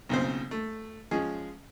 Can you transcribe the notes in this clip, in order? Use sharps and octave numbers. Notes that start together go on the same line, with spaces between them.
B1 A#2 C#3 C4 C5
A3
F3 G#3 C#4 G#4